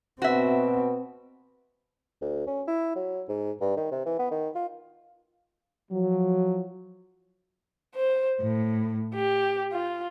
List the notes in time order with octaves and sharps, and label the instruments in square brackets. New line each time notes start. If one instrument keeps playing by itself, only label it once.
[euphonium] B2 [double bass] C4 [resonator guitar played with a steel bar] F#4 E5
[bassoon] D2
C#4
E4
F#3
G#2
G2
D#3
C3
E3
B3
D#3
F4
[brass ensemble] F3 F#3
[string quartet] C5
A2
G4
F4